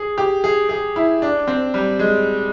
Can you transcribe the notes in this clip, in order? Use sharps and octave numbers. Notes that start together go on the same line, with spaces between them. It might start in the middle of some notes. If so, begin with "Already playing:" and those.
Already playing: G#4
G4
G#4
G#4
E4
D4
C4
G3
G#3